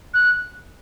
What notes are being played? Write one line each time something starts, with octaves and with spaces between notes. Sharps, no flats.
F#6